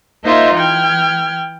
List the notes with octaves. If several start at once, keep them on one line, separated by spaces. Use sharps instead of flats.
A#3 D#4 F4 C5 D#5 E5
E3 G5 F6 G#6